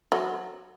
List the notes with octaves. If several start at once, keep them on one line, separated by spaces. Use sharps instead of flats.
F#3